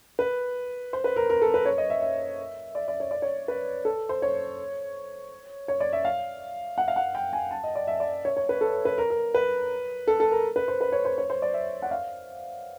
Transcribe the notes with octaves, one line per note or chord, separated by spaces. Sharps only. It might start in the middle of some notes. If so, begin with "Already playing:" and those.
B4
C5
B4
A#4
A#4
A4
B4
C#5
D#5
E5
E5
D5
D5
C#5
D5
C#5
B4
A4
C5
C#5
C#5
D5
E5
F5
F#5
F5
F#5
G5
G#5
A5
D#5
D5
E5
D5
C#5
C#5
B4
A4
B4
A#4
A#4
B4
A4
A4
A#4
B4
C5
B4
C#5
C5
C#5
C5
D5
E5
F#5
F5